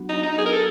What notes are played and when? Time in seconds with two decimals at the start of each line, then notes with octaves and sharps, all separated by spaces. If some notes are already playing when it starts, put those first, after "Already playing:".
Already playing: F#3 B3 D4 F#4
0.09 D#4
0.23 D#4
0.38 G#4
0.46 A#4
0.52 A4